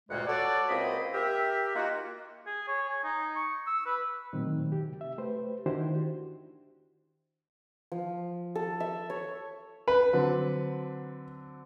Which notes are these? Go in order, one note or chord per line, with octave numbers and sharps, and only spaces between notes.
D2 G2 A#2 G#3 A#3 F#5
F#4 A4 C#5 D5
C#2 A#3 C4 C5 D#5 B5
G4 A#4 E5
A#3 D#4 F4 F#4
G#4
C#5
G#5
D#4
C#6
E6
B4
A#2 D#3 F#3 A3 C4
C3 G4
E5
A3 G4 B4 C5
D#3 D4 E4 F#4 G4 C5
F3
A4
E5
C#5
B4 B6
D3 F#3 C4